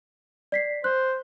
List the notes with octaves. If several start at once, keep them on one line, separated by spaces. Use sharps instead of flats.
D5 B6 C7
C5 F#6